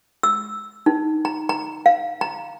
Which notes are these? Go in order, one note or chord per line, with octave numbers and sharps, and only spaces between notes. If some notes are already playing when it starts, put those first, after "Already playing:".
E6
D#4
A#5
A#5
F5
A#5